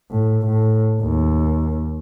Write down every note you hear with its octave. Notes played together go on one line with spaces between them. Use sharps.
A2
A2
D#2